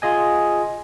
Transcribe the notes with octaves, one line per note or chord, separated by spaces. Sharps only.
F4 G#4 D#5 G#5